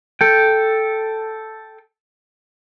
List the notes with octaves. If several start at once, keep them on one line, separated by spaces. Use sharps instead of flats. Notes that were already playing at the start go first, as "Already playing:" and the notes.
A4 G5